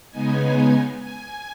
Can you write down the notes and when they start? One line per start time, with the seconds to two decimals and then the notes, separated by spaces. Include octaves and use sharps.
0.10 C#3 G#3 B3 D#4 G#5
1.00 G#5